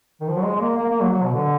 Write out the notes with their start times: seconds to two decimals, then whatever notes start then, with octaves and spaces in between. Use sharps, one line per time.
0.21 D#3
0.29 F3
0.37 F#3
0.43 G#3
0.56 G#3
0.61 A#3
0.77 A#3
0.89 A#3
1.01 F#3
1.11 F#3
1.23 B2
1.34 D3